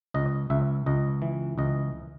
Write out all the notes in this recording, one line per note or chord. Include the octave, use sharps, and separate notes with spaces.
C#2 D#5
C#2 E5
C#2 D#5
E3
C#2 D#5